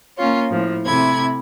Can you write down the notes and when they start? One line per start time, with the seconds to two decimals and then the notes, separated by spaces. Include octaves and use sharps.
0.17 A#3 C#4 F4 C#5
0.50 A2 F3
0.86 C3 A3 E4 G#6